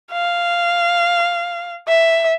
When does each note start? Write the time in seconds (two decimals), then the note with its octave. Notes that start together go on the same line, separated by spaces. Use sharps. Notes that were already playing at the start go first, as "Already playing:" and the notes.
0.13 F5
1.88 E5